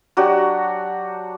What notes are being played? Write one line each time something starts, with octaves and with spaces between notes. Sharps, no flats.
F#3 D4 F#4 G4